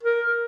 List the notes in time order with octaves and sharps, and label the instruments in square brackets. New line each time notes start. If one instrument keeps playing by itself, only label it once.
[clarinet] A#4